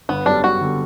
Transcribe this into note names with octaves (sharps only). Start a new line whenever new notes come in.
G1 B3
F#2 D3 G3 B3 D4
G1 F#4
D3 G3 B3